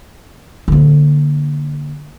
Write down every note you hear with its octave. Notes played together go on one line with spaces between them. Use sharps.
D3 A#3